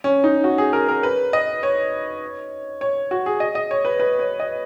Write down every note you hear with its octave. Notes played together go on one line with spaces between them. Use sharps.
C#4
D#4
F#4
G#4
A#4
A#4
B4
D#5
C#5
C#5
F#4
G#4
D#5
D#5
C#5
B4
B4
C#5
D#5